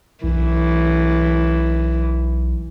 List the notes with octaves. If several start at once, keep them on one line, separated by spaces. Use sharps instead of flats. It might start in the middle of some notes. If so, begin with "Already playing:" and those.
B1 E3